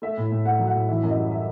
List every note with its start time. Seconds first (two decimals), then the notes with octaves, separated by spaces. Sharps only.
0.02 A3 E5
0.17 A2
0.32 A2
0.45 A3 F#5
0.59 F#3
0.67 F#5
0.74 A2
0.89 E3 E5
1.04 F#2
1.10 D#5
1.17 G3
1.31 E5